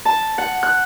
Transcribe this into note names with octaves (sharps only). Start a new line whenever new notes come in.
A5
F#5
F#6